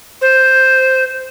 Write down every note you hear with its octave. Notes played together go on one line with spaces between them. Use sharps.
C5